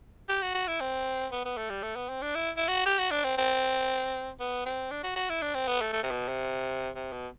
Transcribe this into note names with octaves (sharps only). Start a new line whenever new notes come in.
G4
F#4
F#4
E4
C4
B3
B3
A3
G3
A3
B3
C4
D4
E4
E4
F#4
G4
F#4
D4
C4
C4
B3
C4
D4
F#4
F#4
E4
D4
C4
B3
A3
A3
C3
B2
C3
C3
B2